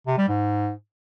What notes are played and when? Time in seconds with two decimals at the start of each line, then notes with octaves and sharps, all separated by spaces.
0.07 C3
0.18 G3
0.28 G#2